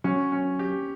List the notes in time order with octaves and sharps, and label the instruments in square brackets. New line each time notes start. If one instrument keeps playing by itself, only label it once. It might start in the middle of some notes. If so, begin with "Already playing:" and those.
[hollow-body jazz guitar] F#3 [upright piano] C#4
[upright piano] C#4
G4